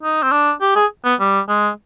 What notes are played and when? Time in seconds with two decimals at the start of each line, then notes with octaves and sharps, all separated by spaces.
0.03 D#4
0.23 C4
0.31 D4
0.61 G4
0.75 G#4
1.04 B3
1.20 G3
1.48 G#3